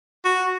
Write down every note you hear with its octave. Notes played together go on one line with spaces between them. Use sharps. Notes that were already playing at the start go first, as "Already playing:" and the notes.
F#4